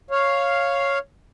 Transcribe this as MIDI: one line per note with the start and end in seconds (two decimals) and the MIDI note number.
0.11 0.99 73
0.11 0.99 77